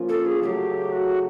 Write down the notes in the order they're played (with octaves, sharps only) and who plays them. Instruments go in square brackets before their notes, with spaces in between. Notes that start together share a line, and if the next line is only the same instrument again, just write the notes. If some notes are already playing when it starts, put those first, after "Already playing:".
Already playing: [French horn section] F3 A#3 C#4 F4
[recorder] A4
G#4
[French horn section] C#3 F#3 A3 [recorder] G4 G#4
[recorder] F#4